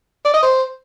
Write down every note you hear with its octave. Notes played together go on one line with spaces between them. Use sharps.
D5
D#5
C5